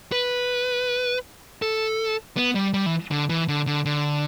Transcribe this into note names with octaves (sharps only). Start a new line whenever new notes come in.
B4
A4
B3
G3
G3
E3
D3
E3
D3
D3
D3